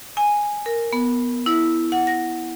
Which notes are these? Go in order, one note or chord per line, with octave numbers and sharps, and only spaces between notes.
G#5
A#4
B3
E4
F#5
A#6